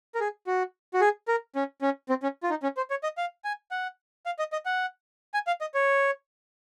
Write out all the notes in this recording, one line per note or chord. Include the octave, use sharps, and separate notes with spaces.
A#4
G#4
F#4
F#4
G#4
A#4
C#4
C#4
C4
C#4
F4
D#4
C#4
C5
C#5
D#5
F5
G#5
F#5
F5
D#5
D#5
F#5
G#5
F5
D#5
C#5